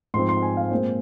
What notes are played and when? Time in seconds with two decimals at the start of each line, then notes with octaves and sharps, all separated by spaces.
0.14 G#2 F3 C4 C6
0.29 C6
0.43 G#5
0.57 F5
0.71 A#2 G#3 C4 C5